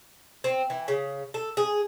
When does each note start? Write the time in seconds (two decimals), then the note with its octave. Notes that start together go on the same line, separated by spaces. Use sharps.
0.44 C4
0.70 E3
0.88 C#3
1.34 A4
1.57 G#4